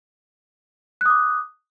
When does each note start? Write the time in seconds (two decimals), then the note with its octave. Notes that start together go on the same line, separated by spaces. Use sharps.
1.01 F#6
1.06 D#6
1.10 D6